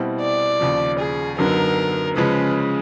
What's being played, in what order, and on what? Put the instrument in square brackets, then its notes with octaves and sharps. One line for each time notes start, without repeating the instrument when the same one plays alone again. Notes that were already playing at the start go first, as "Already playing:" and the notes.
Already playing: [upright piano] B2 G3 C4 E4
[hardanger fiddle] D5
[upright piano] D#2 C#3 F3
[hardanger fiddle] G#4
[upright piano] F#2 D3 F#3 B3 D#4 [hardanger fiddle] A#4
[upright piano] C#3 F3 G#3 C#4 [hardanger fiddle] B4